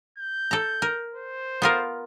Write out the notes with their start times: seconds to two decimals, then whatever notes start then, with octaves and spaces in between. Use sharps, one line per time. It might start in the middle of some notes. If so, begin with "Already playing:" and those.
0.18 G6
0.51 A4 A#5
0.82 A#4
1.14 C5
1.62 B3 F4 A#4